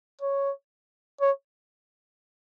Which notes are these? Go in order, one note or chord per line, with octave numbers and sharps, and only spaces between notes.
C#5
C#5